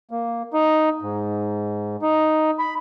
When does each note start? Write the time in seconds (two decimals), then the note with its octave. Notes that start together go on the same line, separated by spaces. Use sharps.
0.11 A#3
0.53 D#4
1.02 G#2
2.02 D#4
2.59 B5